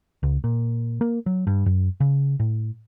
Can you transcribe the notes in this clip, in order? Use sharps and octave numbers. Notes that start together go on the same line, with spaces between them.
C#2
A#2
A#3
F#3
G2
F#2
C#3
A2